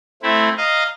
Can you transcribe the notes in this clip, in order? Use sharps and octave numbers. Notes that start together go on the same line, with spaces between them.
A3 C4 E4
D#5 F5 A#5